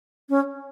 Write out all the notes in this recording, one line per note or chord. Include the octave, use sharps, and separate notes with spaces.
C#4